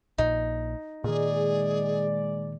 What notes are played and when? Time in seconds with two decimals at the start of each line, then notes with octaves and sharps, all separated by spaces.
0.18 A#1 A#2 D#4
1.04 A#2 D#3 G#3 G#4 D5